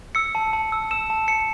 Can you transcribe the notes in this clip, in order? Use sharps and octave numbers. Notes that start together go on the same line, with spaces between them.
E6 C#7
A5
A5
E6
E6 E7
A5
A5 C#7